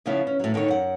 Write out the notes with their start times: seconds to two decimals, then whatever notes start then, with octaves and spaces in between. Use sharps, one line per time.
0.06 C#3 F3 B3 C#4 E4
0.27 C#4
0.39 A2 F#3
0.54 D3 D#3 B3 C#5
0.68 F#2 F#5